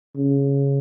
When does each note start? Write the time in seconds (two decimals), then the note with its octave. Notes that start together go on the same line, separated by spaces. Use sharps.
0.16 C#3